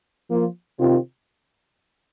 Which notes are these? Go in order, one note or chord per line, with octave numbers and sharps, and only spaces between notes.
F3 A#3 F4
C3 D#3 C4 F4